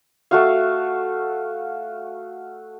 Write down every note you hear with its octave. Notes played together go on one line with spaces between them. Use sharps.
A3 F#4 F5